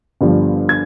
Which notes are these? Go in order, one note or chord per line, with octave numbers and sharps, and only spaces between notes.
G1 G2 F3
G#6